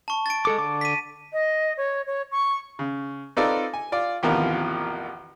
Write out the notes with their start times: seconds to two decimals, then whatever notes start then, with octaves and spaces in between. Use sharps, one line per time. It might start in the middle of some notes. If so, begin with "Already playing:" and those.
0.08 A5 C#6
0.26 A6 D7
0.45 G#3 A4 D6
0.58 D3 D6
0.81 B6 D#7
1.33 D#5
1.77 C#5
2.07 C#5
2.32 C#6
2.79 C#3
3.37 C4 D#4 F4 A4 B4 D5
3.74 G#5
3.92 F4 D5
4.23 A1 E2 C3 D#3 F3 F4